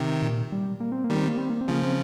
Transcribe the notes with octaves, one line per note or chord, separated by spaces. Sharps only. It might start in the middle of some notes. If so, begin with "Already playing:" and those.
Already playing: C3 D#3
A#2
G3
A#3
C4
A#3
D#3 G3
C4
A#3
C4
A#3
C4
C#3 F3 A#3
C4